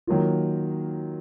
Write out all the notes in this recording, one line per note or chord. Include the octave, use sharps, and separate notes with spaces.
D#3 F#3 A#3 F4